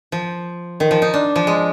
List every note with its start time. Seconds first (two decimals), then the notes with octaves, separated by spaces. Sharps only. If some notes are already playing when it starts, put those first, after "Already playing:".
0.12 F3
0.80 D#3
0.91 F3
1.02 D#4
1.14 D4
1.36 F3
1.47 G#3